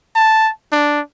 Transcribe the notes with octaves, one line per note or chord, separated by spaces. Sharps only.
A5
D4